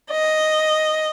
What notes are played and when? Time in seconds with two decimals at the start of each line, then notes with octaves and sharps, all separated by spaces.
0.11 D#5